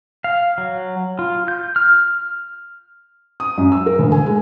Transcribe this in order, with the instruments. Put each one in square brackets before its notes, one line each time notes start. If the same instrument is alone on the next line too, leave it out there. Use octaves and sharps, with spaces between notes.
[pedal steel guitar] F5
F#3
F4
G6
F6
[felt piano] D#6
F#2
E6
A#4
D2
G#5
G#3